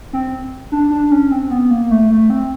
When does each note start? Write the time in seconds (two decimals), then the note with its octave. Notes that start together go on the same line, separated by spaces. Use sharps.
0.13 C4
0.72 D4
0.91 D4
1.12 C#4
1.32 C4
1.51 B3
1.71 A#3
1.91 A3
2.11 A3
2.30 C4